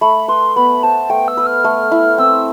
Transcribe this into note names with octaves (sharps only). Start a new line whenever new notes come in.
A3 B5
B4 C6
B3 B5
C5 A5
A3 G5
E6
B4
F6
A3
E4
C4 E6